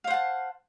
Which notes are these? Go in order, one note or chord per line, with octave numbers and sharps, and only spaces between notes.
C5 F5 F#5 A5